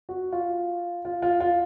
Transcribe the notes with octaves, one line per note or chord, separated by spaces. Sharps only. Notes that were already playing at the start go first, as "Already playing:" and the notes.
F#4
F4
F4
F4
F4